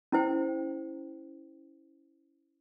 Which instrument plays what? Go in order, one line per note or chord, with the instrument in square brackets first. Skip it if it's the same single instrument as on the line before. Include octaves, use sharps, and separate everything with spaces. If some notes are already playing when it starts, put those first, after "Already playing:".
[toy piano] C#4 E4 C5 G5